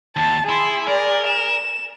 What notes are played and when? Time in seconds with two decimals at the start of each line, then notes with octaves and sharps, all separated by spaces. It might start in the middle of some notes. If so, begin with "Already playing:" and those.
0.16 D#2 A5
0.49 E4 G#4 C6
0.87 A#4 D5
1.26 E7